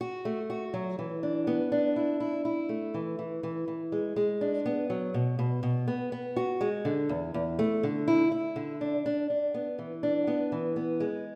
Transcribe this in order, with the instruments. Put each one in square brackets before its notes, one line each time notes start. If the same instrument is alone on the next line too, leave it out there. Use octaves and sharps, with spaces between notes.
[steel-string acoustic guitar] F#4
A3
F#4
F#3
E3
D4
B3
D4
E4
E4
E4
A3
E3
E3
E3
E3
G#3
G#3
D4
B3
F#3
B2
B2
B2
B3
B3
F#4
G#3
D3
E2
E2
A3
D3
E4
E4
D3
D4
D4
D4
B3
E3
D4
B3
E3
B3
G#3